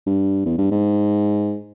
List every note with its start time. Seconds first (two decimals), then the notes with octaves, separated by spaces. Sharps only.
0.06 G2
0.46 E2
0.58 G2
0.71 G#2